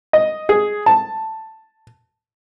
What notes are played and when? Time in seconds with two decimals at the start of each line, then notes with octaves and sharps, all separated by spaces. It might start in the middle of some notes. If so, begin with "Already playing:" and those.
0.13 D#5
0.49 G#4
0.86 A5